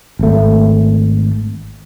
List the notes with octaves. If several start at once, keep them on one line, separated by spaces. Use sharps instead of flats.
G#1 A3